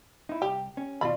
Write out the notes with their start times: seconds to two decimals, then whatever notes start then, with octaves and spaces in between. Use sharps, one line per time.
0.29 D#4 E4
0.42 C2 G4
0.77 C#4
1.01 D#2 B2 F4 D5 B5